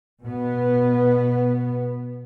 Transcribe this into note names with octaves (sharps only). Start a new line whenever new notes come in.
B2 B3